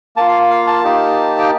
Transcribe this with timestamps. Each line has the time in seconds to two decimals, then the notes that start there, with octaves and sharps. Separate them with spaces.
0.16 A#3 F4 A5
0.28 F5
0.50 F5
0.67 A5
0.84 A#3 D#4 G4
1.39 G5